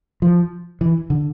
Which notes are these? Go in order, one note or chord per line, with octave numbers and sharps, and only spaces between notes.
F3
E3
D3